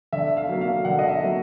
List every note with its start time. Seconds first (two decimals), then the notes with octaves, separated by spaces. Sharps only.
0.13 D3 E5
0.37 F5
0.49 F#3 A#3
0.61 F5
0.85 D3 F#5
0.99 D#5
1.09 E5
1.20 F#3 A#3